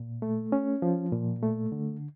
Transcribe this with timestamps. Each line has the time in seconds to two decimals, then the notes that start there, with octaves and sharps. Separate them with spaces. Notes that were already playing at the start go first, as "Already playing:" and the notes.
Already playing: A#2
0.22 A3
0.52 C#4
0.82 F3
1.12 A#2
1.43 A3
1.72 D3